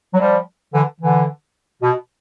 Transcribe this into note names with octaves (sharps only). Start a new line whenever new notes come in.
F#3
F3 G3
D3 E3
D3 E3
B2